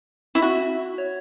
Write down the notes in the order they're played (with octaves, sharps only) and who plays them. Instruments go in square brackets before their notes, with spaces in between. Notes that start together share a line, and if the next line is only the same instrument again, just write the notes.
[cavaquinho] E4
[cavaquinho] F#4 [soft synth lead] E5
[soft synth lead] C#5